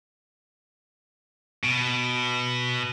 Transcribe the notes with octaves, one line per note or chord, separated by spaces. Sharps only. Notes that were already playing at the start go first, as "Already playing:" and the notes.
B2